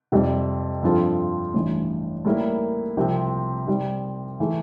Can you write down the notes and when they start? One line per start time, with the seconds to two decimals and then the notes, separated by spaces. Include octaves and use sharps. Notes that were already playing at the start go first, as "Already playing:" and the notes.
0.12 F2 C3 G3 C4
0.83 G2 F3 C4 F4 A4
1.54 A1 G2 E3
2.25 A2 G3 A#3 E4 A#4
2.97 C2 C3 F3 C4
3.67 C3 G3 C4
4.40 E3 A3